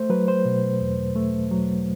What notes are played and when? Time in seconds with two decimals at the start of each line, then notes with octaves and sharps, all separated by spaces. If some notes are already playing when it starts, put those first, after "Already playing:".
Already playing: A3 C5
0.10 F#3 B4
0.28 C5
0.45 B2
0.81 E2
1.15 A3
1.51 F#3